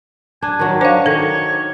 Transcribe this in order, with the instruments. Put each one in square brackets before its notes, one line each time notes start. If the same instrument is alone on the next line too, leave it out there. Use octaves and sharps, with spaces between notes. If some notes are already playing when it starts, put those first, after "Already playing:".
[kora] D4 [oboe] G#5
[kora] D#3 F#3
[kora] D4 [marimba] C5 F5 [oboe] C#5
[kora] D#3 [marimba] A4